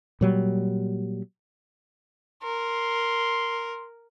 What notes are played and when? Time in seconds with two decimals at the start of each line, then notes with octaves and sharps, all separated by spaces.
0.21 A#2 F#3 G3
2.43 A#4 C6